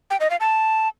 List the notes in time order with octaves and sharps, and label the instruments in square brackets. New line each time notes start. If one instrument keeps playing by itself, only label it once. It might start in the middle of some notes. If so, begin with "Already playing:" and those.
[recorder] G5
D#5
F5
A5